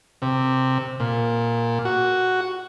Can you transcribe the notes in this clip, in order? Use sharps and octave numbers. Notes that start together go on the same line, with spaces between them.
C3
A#2
F#4